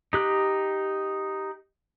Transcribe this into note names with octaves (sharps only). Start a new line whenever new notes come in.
D#4 G4 F#6